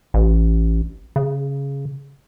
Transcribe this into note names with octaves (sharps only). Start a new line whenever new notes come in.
A1
C#3